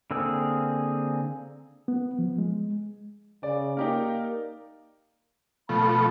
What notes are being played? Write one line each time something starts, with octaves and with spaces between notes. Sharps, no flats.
D3 A#3 C4 G#4 E6
B3
F3
G#3
C#3 D5
A#3 D#4 G4 A#4
B2 F3 A3 B5